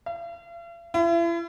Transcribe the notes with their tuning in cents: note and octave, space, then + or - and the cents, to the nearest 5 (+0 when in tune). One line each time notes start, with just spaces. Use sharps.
F5 -45
E4 +40